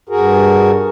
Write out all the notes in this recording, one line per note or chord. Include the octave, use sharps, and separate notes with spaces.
G2 F#4 G#4 A#4